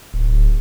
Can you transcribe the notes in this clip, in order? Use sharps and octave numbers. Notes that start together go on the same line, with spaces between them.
D1